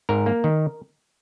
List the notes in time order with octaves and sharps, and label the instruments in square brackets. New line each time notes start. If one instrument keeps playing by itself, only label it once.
[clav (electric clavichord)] G#2 A#4
A#3
D#3